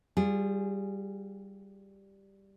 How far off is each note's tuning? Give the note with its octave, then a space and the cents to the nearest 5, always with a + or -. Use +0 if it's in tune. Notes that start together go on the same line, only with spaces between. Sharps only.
G3 +0 F4 +10 G#4 -20